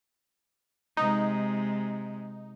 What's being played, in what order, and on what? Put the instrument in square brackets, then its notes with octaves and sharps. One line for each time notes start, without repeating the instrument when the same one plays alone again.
[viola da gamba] C3 G#3 [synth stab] D#4